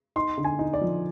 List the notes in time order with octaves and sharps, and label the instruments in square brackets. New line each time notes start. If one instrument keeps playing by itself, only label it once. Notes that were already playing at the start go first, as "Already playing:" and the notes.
[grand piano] D#4 C6
D3
G#5
D#4
D5
F3